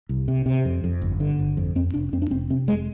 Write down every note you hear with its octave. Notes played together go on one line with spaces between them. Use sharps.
C2
C3
C3
F2
F2
G1
D3
G1
F2
F2 C4
F1 D4
F2 C4
D4
F1 C4
C3 C4
F1 G#3